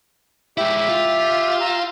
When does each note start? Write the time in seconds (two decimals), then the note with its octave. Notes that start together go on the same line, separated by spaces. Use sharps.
0.58 G#3 E4 G4 E5
0.89 F4
1.61 A#5 E6